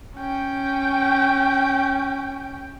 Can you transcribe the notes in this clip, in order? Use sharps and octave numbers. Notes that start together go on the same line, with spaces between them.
C#4 G5